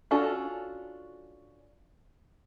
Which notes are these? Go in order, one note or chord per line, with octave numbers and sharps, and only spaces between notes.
C#4 D4 F4 F#4 A4